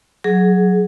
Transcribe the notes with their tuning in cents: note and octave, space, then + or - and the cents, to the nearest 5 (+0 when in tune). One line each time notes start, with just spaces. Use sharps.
F#3 -5 G#4 +10